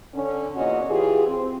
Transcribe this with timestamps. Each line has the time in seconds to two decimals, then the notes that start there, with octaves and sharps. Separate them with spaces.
0.14 D3 C#4
0.56 E2 A#2 C#4 F#4 D#5
0.89 E3 F4 G4 G#4
1.26 C4